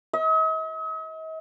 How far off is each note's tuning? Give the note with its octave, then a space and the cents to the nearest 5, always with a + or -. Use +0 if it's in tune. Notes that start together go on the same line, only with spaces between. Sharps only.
D#5 +45